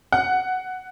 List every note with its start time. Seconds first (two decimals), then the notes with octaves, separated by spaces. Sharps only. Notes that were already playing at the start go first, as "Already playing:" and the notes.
0.12 F#5